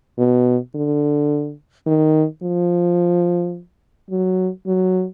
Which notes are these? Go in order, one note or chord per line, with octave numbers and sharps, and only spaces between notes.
B2
D3
D#3
F3
F#3
F#3